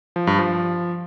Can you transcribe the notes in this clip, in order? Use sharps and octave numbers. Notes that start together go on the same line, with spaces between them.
F3
G2
F3